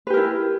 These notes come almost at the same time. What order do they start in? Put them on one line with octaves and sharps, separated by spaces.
B4 G4 A#4 E4